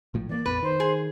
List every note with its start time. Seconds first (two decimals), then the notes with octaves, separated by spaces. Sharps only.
0.14 A#1 A2 F3
0.29 E3 A3 A#3 D5
0.46 A#1 F2 B3 B4
0.63 D#3 C5
0.80 G#4